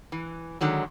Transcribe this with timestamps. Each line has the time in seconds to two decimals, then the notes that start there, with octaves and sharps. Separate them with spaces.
0.12 E3
0.61 D3 D#3 F#3 G#3